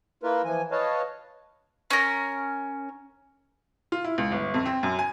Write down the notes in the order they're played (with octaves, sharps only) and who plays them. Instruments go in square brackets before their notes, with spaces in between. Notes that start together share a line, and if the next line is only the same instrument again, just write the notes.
[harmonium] A#3 E4 F4 A#4 B4
E3 F3 G#5
B4 C#5 D#5 F5 A5
[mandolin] C#4 A#4
[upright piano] F4
E4
C#2
G1
F2
C4
F#2
G#5